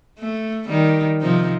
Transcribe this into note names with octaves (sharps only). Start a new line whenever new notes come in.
A3
D#3 G3
C3 F3 D#4